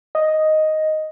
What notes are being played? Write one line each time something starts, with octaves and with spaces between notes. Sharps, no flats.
D#5